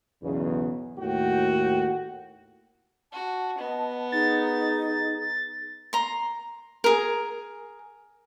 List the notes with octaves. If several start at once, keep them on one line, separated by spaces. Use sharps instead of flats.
B1 E2 C#3
D#2 A2 F#4 G5
F#4 A5
B3 D#5
D#4 G#4 A6
A#5 C6
G#4 A#4